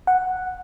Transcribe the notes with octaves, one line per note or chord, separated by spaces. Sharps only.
F#5